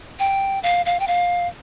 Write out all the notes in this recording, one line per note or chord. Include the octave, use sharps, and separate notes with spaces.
G5
F5
F5
G5
F5